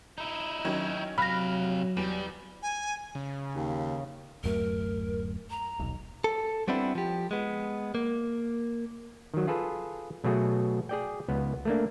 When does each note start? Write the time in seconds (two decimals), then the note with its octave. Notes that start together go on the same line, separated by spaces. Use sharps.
0.18 D#4 E4
0.65 D#3 F#3 C#4
1.18 C3 F#3 F5 B5 F6 F#6 A#6 B6
1.97 E2 G3
2.63 G#5
3.15 C#3
3.55 D#2
4.44 D1 F#2 A3 A#4
5.50 A#5
5.79 D#1 B1
6.24 A4
6.68 G3 B3 C4 D4 E4
6.95 F3 G4
7.31 G#3 B3
7.95 A#3
9.34 D#3 F#3
9.47 F4 G#4 A4 B4
10.24 B2 F#3 A3 F#4 G#4
10.89 G#4 D5 G5
11.28 C#2 B3
11.65 A3 A#3 D4